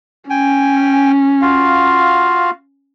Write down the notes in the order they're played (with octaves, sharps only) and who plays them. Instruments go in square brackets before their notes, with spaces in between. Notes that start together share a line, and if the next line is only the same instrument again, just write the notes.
[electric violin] C#4 [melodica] G5 G#5
[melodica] F4 F#4 F5